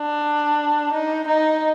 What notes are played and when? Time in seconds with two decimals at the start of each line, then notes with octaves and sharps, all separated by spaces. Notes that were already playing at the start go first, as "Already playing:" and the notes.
Already playing: D4
0.93 D#4
1.27 D#4